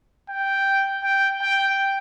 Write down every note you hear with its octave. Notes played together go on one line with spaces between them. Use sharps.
G5
G5
G5